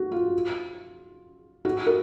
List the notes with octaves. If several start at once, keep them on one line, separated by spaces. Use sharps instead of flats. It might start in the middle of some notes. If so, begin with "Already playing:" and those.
Already playing: F#4
F4
F#4
A#4